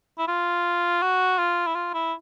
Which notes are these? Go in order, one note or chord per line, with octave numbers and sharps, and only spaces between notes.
E4
F4
F#4
F4
E4
F4
E4